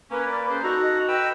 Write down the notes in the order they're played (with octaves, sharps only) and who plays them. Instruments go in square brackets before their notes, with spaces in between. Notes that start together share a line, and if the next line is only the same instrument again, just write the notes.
[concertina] A#3 [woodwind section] C#4 [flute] B4
[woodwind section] D5
C#4 G#4 C5
[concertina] D#4 A4 A#5 [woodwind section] F#4
[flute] D#5
[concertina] B4 G5 E6